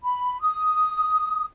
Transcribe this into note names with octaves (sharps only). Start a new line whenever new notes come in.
B5
D#6